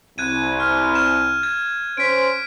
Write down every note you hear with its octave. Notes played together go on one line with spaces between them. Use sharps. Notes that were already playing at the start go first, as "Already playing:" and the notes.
C2 F#6 G#6 D#7
F6
F6 E7
G#6
C#4 C5 B6 D7